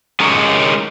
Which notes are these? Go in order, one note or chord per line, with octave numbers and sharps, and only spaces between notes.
G#3 C#4 D#4 A#4 C#5